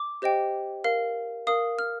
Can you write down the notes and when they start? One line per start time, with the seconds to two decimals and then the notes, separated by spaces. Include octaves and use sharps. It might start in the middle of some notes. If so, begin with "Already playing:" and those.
Already playing: D6
0.22 G4 C5 D#5 G5
0.84 A#4 F5
1.47 A#4 F5 D#6
1.79 F6